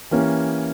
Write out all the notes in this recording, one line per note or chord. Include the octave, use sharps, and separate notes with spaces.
E3 A#3 C#4 G4